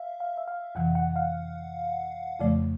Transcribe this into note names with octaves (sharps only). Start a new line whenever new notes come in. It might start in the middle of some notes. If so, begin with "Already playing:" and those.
Already playing: E5 F5
F5
E5
F5
F2 C3 E3 F#5
F#5
F5
F2 C#3 F3 A3 D5